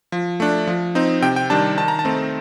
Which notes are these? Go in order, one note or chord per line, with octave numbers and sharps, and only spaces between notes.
F3
A3 D4
F3
C4 D#4
C3 G5
G5
D#3 G3 D4 A5
D#3 A5
A#5
A5
A3 C4 D#4